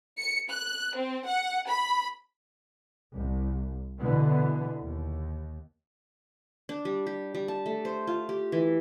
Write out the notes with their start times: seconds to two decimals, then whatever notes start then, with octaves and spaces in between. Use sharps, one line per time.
0.18 C#7
0.50 F#6
0.96 C4
1.27 F#5
1.68 B5
3.14 C2
3.98 B2 D3 E3 B3
4.84 D#2
6.69 D4
6.85 G3
7.07 G4
7.35 G3
7.48 A5
7.66 A3
7.85 C5
8.07 F4
8.29 G4
8.52 E3